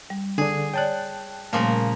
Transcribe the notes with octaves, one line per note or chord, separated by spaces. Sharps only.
G3
D3 D4 G#4
C#5 D5 G5 A5 F#6
A#2 C#3 F3 G3 A3 A#3